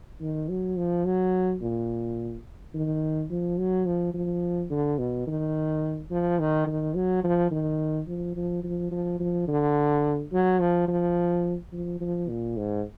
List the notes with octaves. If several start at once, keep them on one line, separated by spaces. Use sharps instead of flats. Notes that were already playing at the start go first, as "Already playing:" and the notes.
D#3
F#3
F3
F#3
A#2
D#3
F3
F#3
F3
F3
D3
B2
D#3
F3
D#3
D#3
F#3
F3
D#3
F3
F3
F3
F3
F3
D3
F#3
F3
F3
F3
F3
A#2
G#2